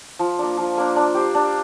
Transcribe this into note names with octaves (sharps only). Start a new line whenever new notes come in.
F3
A#3 D4
F3
A#3 D4
D4
G4 C5
D4